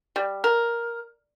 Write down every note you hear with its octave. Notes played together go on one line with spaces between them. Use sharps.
G3
A#4